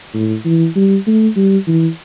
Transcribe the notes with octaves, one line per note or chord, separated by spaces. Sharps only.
A2
E3
G3
A3
G3
E3